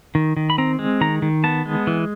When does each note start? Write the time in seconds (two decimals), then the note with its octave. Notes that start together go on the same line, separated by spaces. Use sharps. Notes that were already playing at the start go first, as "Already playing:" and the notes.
0.15 D#3
0.37 D#3
0.50 B5
0.58 C4 A#5
0.79 G#3
1.01 D#3 A#5
1.22 D#3
1.44 B3 A5
1.66 G#3
1.87 E3